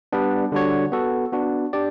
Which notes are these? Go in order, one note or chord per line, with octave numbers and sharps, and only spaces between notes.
G3 B3 D4
D3 G3 D4 F#4 C#5
B3 F#4 A4
B3 D4 F#4
D4 G4 D5